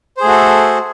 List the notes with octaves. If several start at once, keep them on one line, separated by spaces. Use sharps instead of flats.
A3 F#4 G#4 A4 C5